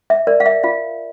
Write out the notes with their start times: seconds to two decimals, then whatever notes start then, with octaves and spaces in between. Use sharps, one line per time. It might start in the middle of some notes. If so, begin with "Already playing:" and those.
0.10 E5
0.27 A#4 D5
0.40 F5
0.46 E5
0.64 F4 F5